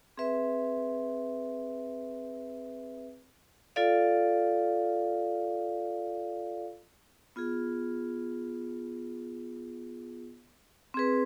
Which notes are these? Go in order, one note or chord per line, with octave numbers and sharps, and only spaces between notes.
C4 G#4 B4 E5
F4 A4 D5 F5
B3 F4 G#4
C4 G#4 B4